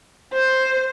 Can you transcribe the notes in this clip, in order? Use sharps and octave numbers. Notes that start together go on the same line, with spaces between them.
C5